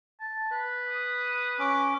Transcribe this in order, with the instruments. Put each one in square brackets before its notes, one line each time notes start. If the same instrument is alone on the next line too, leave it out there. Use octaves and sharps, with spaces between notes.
[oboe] A5
B4
[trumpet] D#6
[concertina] C#4 [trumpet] D6